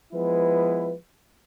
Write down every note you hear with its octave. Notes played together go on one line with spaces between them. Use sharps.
F3 G#3 B3 E4 B4